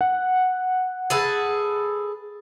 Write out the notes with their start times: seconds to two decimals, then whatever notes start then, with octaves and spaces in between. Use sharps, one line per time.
0.01 F#5
1.10 G#4 A4 B4